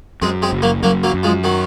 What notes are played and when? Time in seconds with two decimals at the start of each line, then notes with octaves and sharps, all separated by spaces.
0.22 F#2 G#3 C4
0.42 G#3 C4
0.53 F#1
0.62 F#3 A#3
0.83 F#2 F#3 A#3
1.03 F#3 A#3
1.14 F#2
1.23 F3 G#3
1.44 D#3 F#3